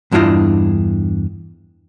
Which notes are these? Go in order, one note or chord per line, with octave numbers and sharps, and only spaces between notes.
E2 G2 D4 E4 F4 D#5